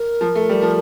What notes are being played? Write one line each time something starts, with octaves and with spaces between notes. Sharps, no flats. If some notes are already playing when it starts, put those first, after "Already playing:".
Already playing: A#4
F3
A3
G3
F3